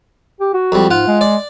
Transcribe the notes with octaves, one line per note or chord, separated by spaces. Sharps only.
G4
F#4
F2 G3
G#2 F4 F#5
G#3
D5